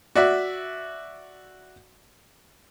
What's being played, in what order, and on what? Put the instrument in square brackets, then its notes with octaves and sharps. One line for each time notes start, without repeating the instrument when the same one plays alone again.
[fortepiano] F#4 D5 E5